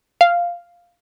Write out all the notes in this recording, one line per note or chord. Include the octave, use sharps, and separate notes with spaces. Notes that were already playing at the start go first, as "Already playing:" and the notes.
F5